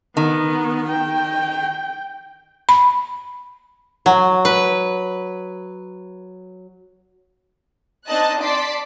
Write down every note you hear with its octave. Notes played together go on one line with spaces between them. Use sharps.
D#3 B3
G5
B5
F#3
B4
C4 D4 D#4 D#5 A5 F#6
D5 A5 C6 D6 B6